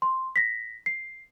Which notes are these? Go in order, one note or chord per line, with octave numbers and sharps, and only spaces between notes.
C6
A#6 B6
C7